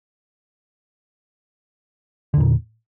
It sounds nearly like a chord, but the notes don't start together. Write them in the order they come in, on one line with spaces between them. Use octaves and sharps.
D3 E2 A#2